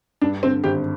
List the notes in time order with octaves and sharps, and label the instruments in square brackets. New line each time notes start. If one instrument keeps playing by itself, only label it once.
[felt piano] G2 [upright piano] D4
[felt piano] D3 [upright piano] C4
[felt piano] G#1 [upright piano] G4